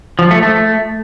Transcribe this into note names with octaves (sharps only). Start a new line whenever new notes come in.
F3
A3
A3